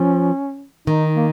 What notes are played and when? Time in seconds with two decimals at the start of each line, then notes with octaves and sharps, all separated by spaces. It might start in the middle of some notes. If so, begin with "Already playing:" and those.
Already playing: F3 C#4
0.87 D#3 D#4
1.16 A#3